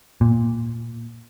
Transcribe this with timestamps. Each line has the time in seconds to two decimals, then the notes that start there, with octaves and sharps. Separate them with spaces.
0.21 A#2